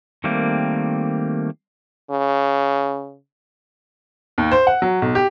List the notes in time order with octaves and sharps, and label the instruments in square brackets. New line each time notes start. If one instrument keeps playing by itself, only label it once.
[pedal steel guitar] D#3 G3 A3 A#3 C4
[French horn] C#3
[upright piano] D#2
C5
F#5
F#3
B1
G4